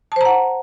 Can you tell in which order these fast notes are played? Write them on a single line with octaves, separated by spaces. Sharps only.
A5 C5 A#5 F#5